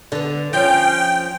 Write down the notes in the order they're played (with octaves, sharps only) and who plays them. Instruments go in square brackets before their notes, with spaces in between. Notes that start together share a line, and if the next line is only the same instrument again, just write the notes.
[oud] D3 B3
[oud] F3 C#4 [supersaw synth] G5